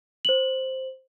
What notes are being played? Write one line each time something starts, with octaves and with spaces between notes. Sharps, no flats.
C5 F#7